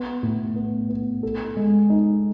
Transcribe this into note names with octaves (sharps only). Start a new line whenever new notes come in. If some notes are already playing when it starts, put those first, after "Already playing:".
Already playing: B3
A2
B3
B3
A4
G#3
D#4